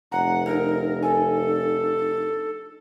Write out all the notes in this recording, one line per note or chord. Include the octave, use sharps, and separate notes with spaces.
F1 F#5 A#5
D4 D#4 A#4
A4 G#5